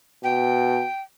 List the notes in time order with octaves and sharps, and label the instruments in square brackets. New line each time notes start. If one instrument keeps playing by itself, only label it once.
[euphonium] B2 [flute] G5